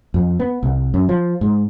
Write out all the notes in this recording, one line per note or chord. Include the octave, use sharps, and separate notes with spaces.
F2
B3
C2
F#2
F3
G#2